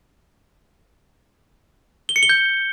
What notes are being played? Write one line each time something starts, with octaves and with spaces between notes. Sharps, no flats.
G7
C#7
G7
G6